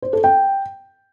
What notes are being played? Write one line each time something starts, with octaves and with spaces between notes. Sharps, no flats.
C5
A4
G5